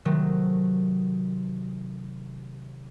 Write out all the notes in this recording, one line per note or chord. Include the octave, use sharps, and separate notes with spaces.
C3 D#3 F#3 A3